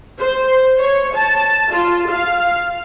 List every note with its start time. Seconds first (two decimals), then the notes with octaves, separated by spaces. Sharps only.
0.20 C5
0.79 C#5
1.16 A5
1.72 F4
2.09 F5